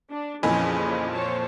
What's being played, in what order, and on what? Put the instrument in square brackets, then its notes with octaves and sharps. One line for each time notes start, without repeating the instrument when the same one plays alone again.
[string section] D4
[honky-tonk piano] F2 A#2 E3 [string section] C#3 F3 [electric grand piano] D#5 G#5 B5
[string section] C5 C#5 A5